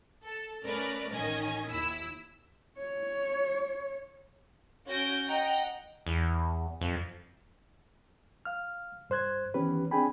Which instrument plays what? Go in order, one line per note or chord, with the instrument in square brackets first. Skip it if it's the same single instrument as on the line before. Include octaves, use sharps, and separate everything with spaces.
[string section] A4
A3 C#4 A#4 B4 D5
A1 D#3 C#4 D#5 G#5
D#2 E4 E6
[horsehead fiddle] C#5
[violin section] C#4 F#4 G6 A#6 D7
D#5 F#5 G5 A#5
[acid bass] E2
F2
[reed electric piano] F5 F6
G2 C5 F#6 G#6
D#3 E3 B3 C#4 G4 B4
C4 D4 G#4 G5 G#5 B5